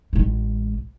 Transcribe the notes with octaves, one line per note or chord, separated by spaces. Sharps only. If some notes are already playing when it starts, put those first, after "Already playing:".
A1 G#3